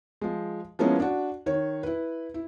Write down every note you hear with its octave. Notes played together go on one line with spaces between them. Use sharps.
F3 G#3
F3 G#3 A#3 B3 C#4 E4
D4 F#4
D#3 C#5
E4 B4
E4